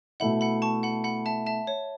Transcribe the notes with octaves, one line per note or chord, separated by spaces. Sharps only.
B2 A3 E4 F#5 B5
F#5 B5
A5 C#6
F#5 B5
F#5 B5
E5 A5
E5 A5
C#5